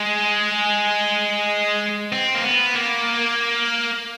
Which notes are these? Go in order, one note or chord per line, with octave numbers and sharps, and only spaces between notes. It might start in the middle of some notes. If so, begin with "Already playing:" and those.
Already playing: G#3
C4
A#3
B3
A#3